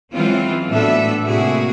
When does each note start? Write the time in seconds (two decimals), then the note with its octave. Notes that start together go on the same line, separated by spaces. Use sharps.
0.14 E3 F#3 G#3 C4 C#4 F4
0.68 A2 B3 D4 F#4 A4 E5
1.28 A2 C3 A#3 E4 F#4 G#4